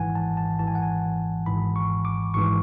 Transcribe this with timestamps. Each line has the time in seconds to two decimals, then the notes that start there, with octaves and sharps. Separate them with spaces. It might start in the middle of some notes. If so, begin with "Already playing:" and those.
Already playing: G#1 G#2 E3 F#5 G#5
0.15 A5
0.37 A5
0.58 G#1 G#2 E3 A5
0.67 G#5
0.75 F#5
0.82 G#5
1.46 G#1 G#2 E3 B5
1.76 C#6
2.05 D6
2.34 G#1 G#2 E3 C#6